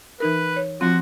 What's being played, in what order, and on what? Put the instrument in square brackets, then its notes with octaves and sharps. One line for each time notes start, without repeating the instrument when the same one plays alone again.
[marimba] E3 D#4 A#4 [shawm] B4
[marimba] C#5
[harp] F3 C6 [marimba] C4 [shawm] F#4